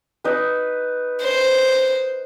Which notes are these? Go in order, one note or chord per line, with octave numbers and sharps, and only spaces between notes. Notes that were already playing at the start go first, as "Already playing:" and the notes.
D#4 B4
C5